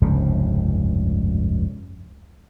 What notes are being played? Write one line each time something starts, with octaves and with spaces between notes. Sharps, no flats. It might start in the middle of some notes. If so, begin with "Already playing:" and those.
F1 C#2 G2 C#3